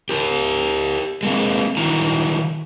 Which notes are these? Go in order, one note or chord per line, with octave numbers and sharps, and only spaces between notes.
G4 A#4
G#3 A#3 C4
D#3 F#3 E4 A#5